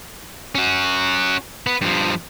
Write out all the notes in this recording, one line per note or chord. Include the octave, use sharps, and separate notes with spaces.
C#4 F#4
B3 B4
G2 F3